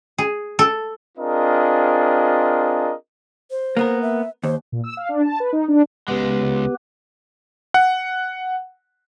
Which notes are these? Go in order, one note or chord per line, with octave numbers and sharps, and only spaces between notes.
G#4
A4
C4 D4 F4 G#4 A#4 D#5
C5
A#3 B3 A#4
E5
D#2 C5
A#2
E6
F5
D4
A5
B4
D#4
D4
C#2 G#3 B3 G4 B4
F#5